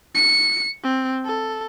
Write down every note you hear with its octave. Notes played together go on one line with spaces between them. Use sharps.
C#7
C4
A4